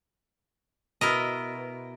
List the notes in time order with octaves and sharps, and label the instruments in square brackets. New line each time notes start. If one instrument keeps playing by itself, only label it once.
[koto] B2 E4 A#4 D#5